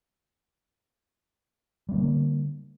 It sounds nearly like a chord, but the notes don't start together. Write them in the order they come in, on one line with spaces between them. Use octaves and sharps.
G3 C4 D3 A#3